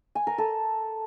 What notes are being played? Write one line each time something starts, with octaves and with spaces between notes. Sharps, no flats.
G#5
A#4
A4